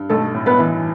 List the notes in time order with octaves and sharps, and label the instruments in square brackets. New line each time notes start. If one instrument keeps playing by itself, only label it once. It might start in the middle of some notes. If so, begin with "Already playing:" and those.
Already playing: [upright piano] G2
[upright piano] B1 [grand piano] A3 A4
[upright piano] A2
[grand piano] B3 B4
[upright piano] E3